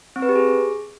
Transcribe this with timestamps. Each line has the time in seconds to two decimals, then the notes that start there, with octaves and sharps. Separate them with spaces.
0.16 C4
0.22 B4
0.29 G4
0.35 G#4